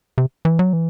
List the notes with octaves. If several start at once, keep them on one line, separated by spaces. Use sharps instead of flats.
C3
E3
F#3
E3